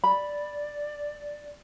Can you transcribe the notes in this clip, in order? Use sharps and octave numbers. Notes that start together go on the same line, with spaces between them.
D5 B5